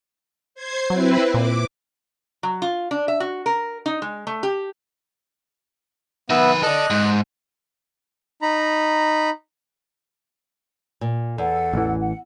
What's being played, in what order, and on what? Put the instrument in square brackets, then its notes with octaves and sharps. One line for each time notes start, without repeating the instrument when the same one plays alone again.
[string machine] C5 G#6 C7
[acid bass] F#3 [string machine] C4 E4 B4
[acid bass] A#2 [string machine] D6
[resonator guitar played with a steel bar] F#3
F4
D4
E5
F#4
A#4
D#4
G#3
A3
G4
[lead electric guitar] D#3 B4 [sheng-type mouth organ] B3 E5
[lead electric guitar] A4 D5 [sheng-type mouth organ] D#5 F#6
[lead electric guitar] G#2
[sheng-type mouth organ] D#4 A#5 B5
[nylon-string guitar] A#2
[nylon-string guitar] E2 [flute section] A4 F#5
[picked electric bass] A1 E3
[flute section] F#5